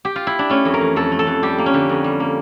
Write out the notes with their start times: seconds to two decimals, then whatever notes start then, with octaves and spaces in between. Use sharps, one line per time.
0.05 G4
0.16 F4
0.27 E4
0.39 D4
0.50 A3 C#4
0.65 F2
0.74 A#4
0.81 E3
0.96 F2 A4
1.12 A3
1.19 A4
1.27 F2
1.43 G3 G4
1.58 A#3
1.66 C#4
1.74 D3
1.89 F2
2.04 G3
2.20 A#3